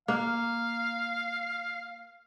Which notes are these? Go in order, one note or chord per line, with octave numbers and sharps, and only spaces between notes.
A#3 F5